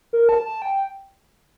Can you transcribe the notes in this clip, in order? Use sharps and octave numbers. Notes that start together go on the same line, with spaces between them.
A#4
A5
A5
G5